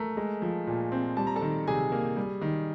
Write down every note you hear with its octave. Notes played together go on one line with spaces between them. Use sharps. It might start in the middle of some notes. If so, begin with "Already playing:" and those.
Already playing: A3 A#4 A#5
G#3
F3
A#2
C4
G3 A5
A#5
A4 A5
D#3
C3 G#4 G#5
A#3
G3
D#3